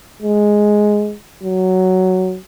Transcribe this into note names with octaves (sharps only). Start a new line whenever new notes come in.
G#3
F#3